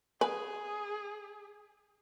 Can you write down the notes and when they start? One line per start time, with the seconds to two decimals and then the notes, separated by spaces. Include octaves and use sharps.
0.21 G#4 B4 G#5